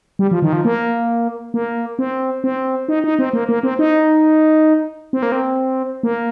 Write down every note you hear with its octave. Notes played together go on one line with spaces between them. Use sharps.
G3
F3
D#3
F3
A#3
A#3
C4
C4
D#4
D#4
C4
A#3
A#3
C4
D#4
C4
A#3
C4
A#3